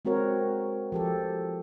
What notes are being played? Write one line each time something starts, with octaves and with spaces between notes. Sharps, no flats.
G#3 C4 F#4 A#4 C#5
F3 G4 A4